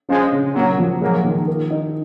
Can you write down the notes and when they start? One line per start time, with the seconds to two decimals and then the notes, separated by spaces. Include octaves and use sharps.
0.09 F3 G#3 C#4
0.32 C#3
0.55 A#2 F#3 A#3
0.79 F3
1.01 F#3 G#3 A#3
1.24 D#3
1.47 A#4
1.70 D#4